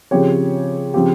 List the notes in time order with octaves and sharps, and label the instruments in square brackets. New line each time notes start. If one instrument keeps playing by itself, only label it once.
[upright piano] C#3 F3 C4 G4 C#5
C#3 F3 C4 G4